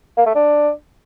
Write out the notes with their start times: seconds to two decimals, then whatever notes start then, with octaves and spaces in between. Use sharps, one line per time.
0.17 A#3
0.26 A3
0.35 D4